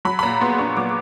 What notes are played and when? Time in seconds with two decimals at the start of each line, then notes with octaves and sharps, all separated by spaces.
0.05 F#3 B5
0.19 B5
0.23 A#2 A#5
0.41 B3 C6
0.59 D4 C#6
0.77 F#3 D6